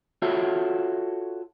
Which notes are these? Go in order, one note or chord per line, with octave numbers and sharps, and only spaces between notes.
F4 F#4 A4 C#5 E5